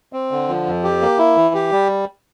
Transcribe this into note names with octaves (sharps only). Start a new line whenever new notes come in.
C4
D3
F3
F2
G4
A#3
E4
E3
G4
G3